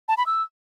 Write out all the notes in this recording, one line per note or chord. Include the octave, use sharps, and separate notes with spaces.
A5
B5
E6